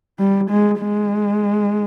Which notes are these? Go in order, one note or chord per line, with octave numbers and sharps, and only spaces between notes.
G3
G#3
G#3